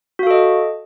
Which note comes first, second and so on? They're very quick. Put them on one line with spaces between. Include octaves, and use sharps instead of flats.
F#4 F5 A4 D#5